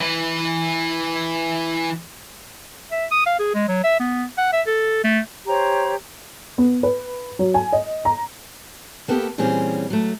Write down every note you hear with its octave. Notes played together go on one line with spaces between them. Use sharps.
E3 B4
E5
D#6
F5
G#4
G#3
F#3
E5
B3
F#5
E5
A4
A3
G4 C5 C#5 A#5
B3
B4
F#3
G#5
D#5
A#5
A#3 B3 G4 A4
A#2 E3 G3 C4 C#4 G#4
F#3 A3